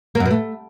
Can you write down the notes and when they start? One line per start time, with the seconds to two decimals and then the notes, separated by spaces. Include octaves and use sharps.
0.15 A#3
0.20 F#2
0.25 B2
0.31 A3